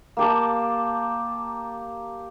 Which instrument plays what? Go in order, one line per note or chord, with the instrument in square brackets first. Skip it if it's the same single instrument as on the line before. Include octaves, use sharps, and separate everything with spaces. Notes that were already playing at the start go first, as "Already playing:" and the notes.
[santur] A#3 G4 A5